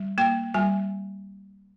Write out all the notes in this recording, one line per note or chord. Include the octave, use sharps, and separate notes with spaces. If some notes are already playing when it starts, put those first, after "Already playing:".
Already playing: G3
A#3 G5
G3 G#5